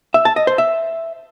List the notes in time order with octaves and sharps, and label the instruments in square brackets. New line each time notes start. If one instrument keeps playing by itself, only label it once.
[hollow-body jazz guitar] E5
A5
D#5
C5
E5